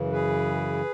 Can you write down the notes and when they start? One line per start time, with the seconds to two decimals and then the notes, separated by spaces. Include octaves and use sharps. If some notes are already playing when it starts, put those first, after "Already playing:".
Already playing: F#2 C#3 E3
0.12 G#4 B4